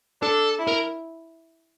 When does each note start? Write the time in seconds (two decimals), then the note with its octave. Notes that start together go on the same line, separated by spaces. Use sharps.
0.22 D4 A4
0.59 E4
0.67 A#4